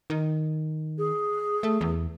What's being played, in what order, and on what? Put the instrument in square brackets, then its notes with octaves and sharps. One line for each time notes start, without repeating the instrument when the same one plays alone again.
[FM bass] D#3
[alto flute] G#4
[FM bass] A3
E2